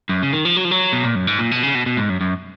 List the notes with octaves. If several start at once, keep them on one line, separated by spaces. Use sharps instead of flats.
F#2
C#3
D#3
F3
F#3
F3
F#3
B2
A#2
F#2
G#2
A#2
B2
C#3
B2
B2
G#2
F#2
F#2